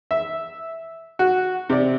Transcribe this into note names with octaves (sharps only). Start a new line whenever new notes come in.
E5
F#4
C3 D5